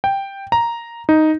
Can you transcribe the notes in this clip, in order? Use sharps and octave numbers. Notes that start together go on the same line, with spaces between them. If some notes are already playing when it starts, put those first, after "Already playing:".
G5
A#5
D#4